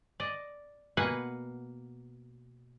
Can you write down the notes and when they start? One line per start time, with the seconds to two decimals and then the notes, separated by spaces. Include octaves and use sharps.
0.20 D5 D#5
0.97 B2 A#3 B4 F#5 G#5